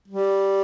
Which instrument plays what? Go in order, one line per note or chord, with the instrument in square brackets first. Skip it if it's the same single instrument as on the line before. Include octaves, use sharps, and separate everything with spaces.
[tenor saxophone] G3